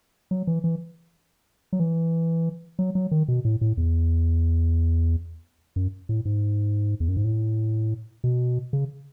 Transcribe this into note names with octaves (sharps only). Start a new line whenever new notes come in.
F#3
E3
E3
F#3
E3
F#3
F#3
D#3
B2
A2
A2
E2
F#2
A2
G#2
E2
F#2
G#2
A2
B2
C#3